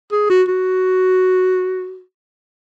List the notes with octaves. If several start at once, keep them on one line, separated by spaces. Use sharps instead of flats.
G#4
F#4
F#4